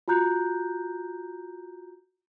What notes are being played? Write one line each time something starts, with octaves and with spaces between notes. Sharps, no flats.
F4 F#4 A#5 F#6 G6